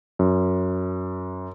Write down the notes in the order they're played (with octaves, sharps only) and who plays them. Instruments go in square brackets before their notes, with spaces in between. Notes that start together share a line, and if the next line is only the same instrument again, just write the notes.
[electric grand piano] F#2